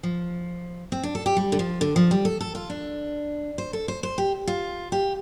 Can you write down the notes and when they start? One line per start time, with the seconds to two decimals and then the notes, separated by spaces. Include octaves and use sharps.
0.03 F3
0.92 C4
1.03 D4
1.15 A4
1.26 G4
1.37 G3
1.52 D3
1.59 F3
1.81 D3
1.96 F3
2.11 G3
2.25 A4
2.41 A4
2.55 F4
2.70 D4
3.58 C5
3.73 A4
3.88 C5
4.03 C5
4.18 G4
4.47 F4
4.92 G4